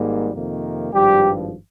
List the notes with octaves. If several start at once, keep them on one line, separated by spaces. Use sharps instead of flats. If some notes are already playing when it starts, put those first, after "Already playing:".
Already playing: G#1 G#2 G3 A#3
F2 C3 D#3 A#3
G#1 G2 F3 G3 G4